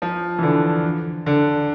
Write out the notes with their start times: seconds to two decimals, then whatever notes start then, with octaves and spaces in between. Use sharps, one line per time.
0.02 F3
0.38 E3
0.43 D3
1.26 D3